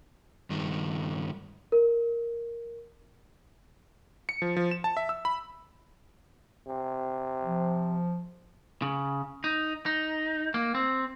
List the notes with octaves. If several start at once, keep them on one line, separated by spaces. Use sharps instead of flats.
G2 D#3
A#4
C#7
F3
F3
E7
A5
E5
E6
B5
C3
F3
C#3
D#4
D#4
A#3
C4